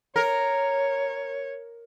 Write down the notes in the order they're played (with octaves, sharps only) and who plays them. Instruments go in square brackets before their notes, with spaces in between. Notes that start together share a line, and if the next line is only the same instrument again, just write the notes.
[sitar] A#4 [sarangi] C#5